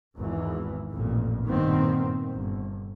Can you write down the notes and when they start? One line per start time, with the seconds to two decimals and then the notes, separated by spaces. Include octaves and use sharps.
0.17 G#1 E2 E3
0.93 A1 F2 A#2
1.45 G2 A#2 D#3 B3 C4
2.30 G1